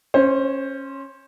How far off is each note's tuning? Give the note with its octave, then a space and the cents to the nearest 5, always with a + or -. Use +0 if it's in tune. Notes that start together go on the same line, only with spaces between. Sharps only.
C#4 -15 C5 +10